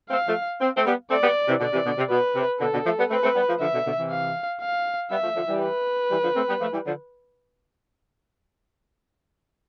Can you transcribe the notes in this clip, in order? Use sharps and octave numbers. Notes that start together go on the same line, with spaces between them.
A3 C4 F5
F3 A3
C4
A3 C4
G3 B3
A3 C4 D5
G3 B3
C3 E3
B2 D3 D5
C3 E3
B2 D3
C3
B2 B4
C3
B2 D3 A4
B2 D3
F3 A3
G3 B3
A3 C4 B4
A3 C4
G3 B3
F3 A3
D3 F3 E5
B2 D3
B2 D3
C3 E3
F5
F5
G3 B3 E5
F3 A3
D3 F3
E3 G3
B4
E3 G3
D3 F3
A3 C4
G3 B3
F3 A3
E3 G3
D3 F3